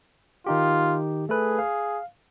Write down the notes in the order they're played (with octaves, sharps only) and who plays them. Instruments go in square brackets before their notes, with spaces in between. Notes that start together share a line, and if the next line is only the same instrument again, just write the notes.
[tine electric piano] D#3 D#4 G4 [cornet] F4
[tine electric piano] A3 A4 B4 [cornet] G#4
[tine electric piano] F5